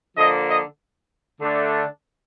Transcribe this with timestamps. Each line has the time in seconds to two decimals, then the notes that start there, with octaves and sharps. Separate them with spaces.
0.17 D3 F3 A#3 D#5
0.47 D#5
1.40 D3 A3 D4